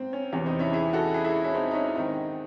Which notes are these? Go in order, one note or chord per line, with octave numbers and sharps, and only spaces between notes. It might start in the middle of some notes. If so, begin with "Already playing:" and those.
Already playing: G#2 C4
C#4
E2 C3 E3 C#4
C4 D#4
C#4 E4
E4 G#4
F#4 A4
E4 G#4
E4 G#4
C#4 E4
C4 D#4
D#4
C#4 E4
G#2 D#3 C4 D#4